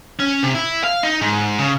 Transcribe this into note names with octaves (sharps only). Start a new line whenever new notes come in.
C#4
C3
E4
F5
D#4
G#2
C#3